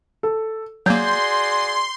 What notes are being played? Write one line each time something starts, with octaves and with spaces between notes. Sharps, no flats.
A4
F#3 A#3 F#4 G#4 D5 C6 G6